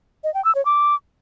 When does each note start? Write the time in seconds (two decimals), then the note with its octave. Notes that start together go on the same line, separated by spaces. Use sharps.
0.24 D#5
0.34 G5
0.45 E6
0.55 C#5
0.65 D6